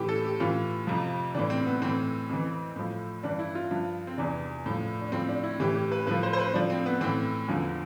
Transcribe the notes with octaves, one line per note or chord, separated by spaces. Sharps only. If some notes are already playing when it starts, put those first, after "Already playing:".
Already playing: A2 E3 G4
A4
G4
A2 E3 F4
F2 C3 F3
A2 E3 D4
C4
B3
A2 E3 C4
F2 E3
A2 F3
G2 E3 D4
E4
F4
G2 F3
C4
E2 C3 E3 D4
A2 F3
D4
A2 F3 C4
D4
E4
A2 E3 G4
G4
B4
A2 F3 B4
C5
C5
B4
A2 F3 D4
C4
B3
A2 E3 C4
E2 D3 F3